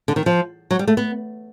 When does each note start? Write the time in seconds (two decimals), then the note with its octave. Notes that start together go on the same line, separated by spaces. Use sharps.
0.08 D3
0.16 D#3
0.26 F3
0.71 F#3
0.79 G3
0.88 A3
0.97 B3